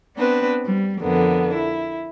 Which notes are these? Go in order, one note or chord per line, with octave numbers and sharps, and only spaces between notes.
B3 C4 D4 B4 C5
G3
F2 D3 A#3 B3
E4